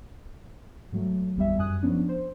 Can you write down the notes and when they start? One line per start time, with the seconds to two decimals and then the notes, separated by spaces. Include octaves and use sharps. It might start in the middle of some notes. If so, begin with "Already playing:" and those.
0.92 G#2 F#3 A3
1.36 G#1 E2 G3 E5
1.58 F#2 G#5 D#6 F#6
1.82 F3 B3 C#4 D4
2.09 C5